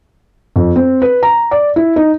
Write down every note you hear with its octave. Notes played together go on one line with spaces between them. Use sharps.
F2
C4
B4
A#5
D5
E4
D#4